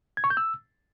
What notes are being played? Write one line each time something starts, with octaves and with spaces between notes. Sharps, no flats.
G#6
C#6
G6
E6